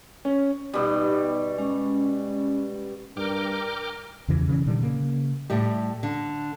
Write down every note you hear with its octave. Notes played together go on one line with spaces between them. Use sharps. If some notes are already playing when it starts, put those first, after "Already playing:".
C#4
B2 G3 B3 D#4 G4
G#3 C#4
G2 A#4 G5 D6 F6
E2 C#3 E3
C#3 E3 C#4
A#2 D3 D#3 G3
C#3 A#3
A2 G3 G4
D3